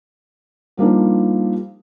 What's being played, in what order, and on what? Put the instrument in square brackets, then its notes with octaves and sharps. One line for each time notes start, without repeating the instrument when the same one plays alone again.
[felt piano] F3 G3 A#3 D4 D#4